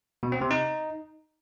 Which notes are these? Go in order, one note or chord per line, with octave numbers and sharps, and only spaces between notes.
B2
C4
C3
D#4